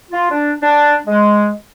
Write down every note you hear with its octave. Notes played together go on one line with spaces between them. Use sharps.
F4
D4
D4
G#3